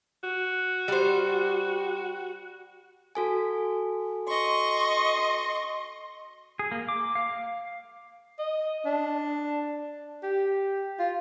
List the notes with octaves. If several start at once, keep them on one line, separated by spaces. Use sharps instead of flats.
F#4
G3 C5
F#4 A4 G#5
D#5 C6 C#6
G#4
A#3
D6
F5
D#5
D4
G4
F4